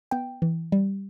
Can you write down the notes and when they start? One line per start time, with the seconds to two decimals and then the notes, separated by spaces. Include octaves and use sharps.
0.11 B3 G5
0.42 E3
0.72 G3